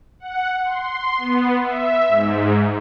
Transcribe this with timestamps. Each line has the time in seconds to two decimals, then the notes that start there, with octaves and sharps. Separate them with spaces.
0.20 F#5
0.64 C6
1.18 B3
1.63 E5
2.07 G#2